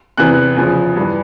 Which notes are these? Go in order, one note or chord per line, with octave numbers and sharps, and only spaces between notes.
E2 C3 E3 F#6
E2 C#3 F3
G2 E3